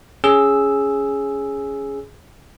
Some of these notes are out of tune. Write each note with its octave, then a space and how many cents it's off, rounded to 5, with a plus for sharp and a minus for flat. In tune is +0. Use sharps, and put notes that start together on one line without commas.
C#4 +10 G#4 +0 E6 +0